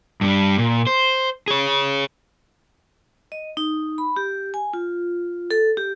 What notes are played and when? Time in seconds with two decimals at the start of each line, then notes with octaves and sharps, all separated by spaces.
0.21 G2 G3
0.58 A#2
0.87 C5
1.48 G#4 C#5
3.32 D#5
3.57 D#4
3.98 B5
4.16 G4
4.54 G#5
4.73 F4
5.51 A4
5.77 G4